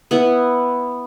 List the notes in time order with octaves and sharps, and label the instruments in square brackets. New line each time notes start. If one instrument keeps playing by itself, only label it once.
[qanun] B3 E4 F#5